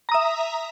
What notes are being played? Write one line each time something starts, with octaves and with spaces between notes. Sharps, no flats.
E5 A#5 D#6